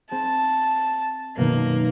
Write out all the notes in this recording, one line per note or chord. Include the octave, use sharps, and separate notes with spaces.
C4 G#4 A5
F#2 B2 D#3 A#3